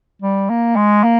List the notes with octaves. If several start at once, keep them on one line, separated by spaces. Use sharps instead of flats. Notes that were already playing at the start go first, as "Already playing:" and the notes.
G3
A#3
G#3
A#3